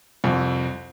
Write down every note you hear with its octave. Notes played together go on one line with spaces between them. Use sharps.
C2 F2